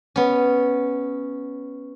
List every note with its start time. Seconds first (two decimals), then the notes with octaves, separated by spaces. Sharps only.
0.16 B3 C#4